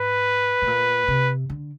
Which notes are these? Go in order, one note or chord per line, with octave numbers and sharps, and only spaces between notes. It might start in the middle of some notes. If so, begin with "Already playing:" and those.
Already playing: G#2 B4
A2
A#2
C3
D3